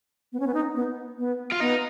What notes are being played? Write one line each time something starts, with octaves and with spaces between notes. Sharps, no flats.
B3
C#4
B3
D#4
B3
B3
F4
B3 D#4